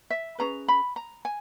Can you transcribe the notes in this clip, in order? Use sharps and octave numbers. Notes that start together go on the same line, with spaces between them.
E5
C#4 G#4 B4 A#5
B5
A#5
G#5